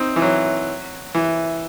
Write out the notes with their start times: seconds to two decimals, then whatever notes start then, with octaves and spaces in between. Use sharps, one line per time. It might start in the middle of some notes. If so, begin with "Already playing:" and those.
Already playing: C4 D#4
0.16 E3
0.22 F#3
1.14 E3